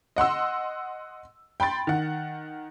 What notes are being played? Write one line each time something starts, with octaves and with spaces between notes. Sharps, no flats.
D#5 F#5 C6 E6
G5 B5 C6 A6
D#3 F#5